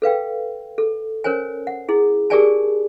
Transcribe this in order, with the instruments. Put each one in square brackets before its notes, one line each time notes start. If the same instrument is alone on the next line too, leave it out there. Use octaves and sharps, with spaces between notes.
[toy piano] A4 B4 F5 G5
A4
C#4 A#4 C5 C#5 G#5
F#5
E4 G#4
G4 G#4 A#4 D5 G#5 A5